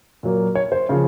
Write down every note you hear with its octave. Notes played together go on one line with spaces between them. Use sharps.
A#2 F#3 A#3
C#5
C5
C#3 F3